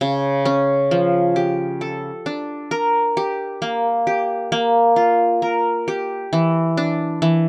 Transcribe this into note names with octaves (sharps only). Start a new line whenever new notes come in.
C#3
C#4
F3
G4
A4
D4
A#4
G4
A#3
G4
A#3
F4
A#4
G4
E3
D4
E3